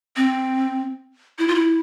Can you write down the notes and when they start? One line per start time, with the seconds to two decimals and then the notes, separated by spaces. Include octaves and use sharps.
0.17 C4
1.39 E4
1.48 F4
1.55 E4